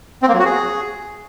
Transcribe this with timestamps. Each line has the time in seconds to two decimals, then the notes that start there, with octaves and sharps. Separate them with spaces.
0.23 C4
0.28 A#3
0.34 F#3
0.39 F#4
0.45 G#4